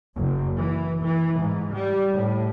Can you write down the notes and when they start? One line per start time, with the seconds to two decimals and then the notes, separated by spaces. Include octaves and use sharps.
0.17 F#1
0.56 E3
1.02 E3
1.39 G#2
1.73 G3
2.12 A2